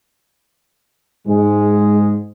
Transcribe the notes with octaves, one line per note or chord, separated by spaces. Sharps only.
G#2 G#3